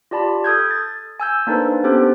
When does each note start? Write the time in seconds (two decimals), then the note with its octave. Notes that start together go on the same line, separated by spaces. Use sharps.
0.11 F4 G4 D5 A5 B5
0.44 A4 D#6 G6 G#6
0.71 A6
1.20 G#5 E6 G6
1.47 A#3 D4 D#4 A4 B4 C5
1.84 B3 C#4 D4 G4 A4 C5